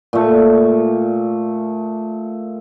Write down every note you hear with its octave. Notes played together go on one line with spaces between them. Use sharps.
A#2 A3